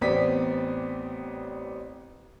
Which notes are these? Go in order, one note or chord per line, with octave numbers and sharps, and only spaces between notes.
A1 B3 C4 D5 B6